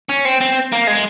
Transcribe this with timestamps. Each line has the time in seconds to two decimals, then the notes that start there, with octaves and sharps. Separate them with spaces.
0.09 C#4
0.25 C4
0.41 C4
0.72 A#3
0.87 G#3